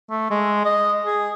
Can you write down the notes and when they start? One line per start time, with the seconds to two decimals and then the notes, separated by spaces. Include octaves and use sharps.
0.10 A3
0.31 G#3
0.65 D#5
1.06 G#4